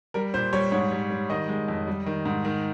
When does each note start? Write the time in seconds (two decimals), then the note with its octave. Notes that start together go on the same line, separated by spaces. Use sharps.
0.14 G3 A#4
0.34 A#2 C5
0.53 G3 C#5
0.72 G#2 C#5
0.91 G3
1.10 G3
1.30 D#3 D#5
1.49 G#3
1.68 F2
1.88 G3
2.06 D#3
2.26 G#2
2.45 D#3